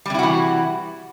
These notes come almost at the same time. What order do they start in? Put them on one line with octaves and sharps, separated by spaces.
G3 C3 E4 F#4 E3